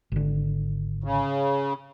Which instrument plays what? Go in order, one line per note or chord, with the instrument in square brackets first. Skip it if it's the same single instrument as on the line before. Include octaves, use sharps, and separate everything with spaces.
[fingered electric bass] G#1 D3
[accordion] C#3